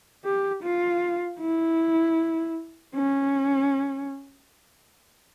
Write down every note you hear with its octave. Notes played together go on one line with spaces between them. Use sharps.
G4
F4
E4
C#4